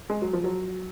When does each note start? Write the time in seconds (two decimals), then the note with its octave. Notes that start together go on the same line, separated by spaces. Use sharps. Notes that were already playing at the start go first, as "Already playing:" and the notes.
0.10 G#3
0.22 F#3
0.33 F3
0.44 F#3